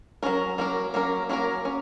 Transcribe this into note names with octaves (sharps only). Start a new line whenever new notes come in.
F#3 A#3 C#4 A#4
F#3 A#3 C#4 A#4
F#3 A#3 C#4 A#4
F#3 A#3 C#4 A#4
C#4